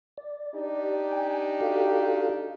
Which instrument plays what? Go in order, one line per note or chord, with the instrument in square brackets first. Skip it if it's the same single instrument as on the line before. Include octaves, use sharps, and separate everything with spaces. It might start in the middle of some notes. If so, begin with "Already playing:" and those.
[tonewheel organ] D5
[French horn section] D4 D#4 G4
[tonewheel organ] G5 G#5
F#4 A4 F5